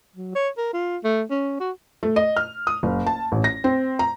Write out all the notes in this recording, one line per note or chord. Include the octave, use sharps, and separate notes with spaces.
F#3
C#5
A#4
F4
A3
C#4
F#4
A3
D#5
F6
D#6
F#1
A5
A1
A#6
C4
A#5